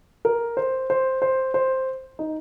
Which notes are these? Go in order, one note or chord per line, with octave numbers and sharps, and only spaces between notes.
A#4
C5
C5
C5
C5
D#4